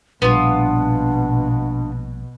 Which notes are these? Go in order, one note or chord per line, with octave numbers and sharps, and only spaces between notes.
A#1 B2 G3 B3 D4 F4